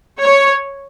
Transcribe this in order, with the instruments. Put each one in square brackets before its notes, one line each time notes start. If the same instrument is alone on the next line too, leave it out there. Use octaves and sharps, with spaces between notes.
[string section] C#5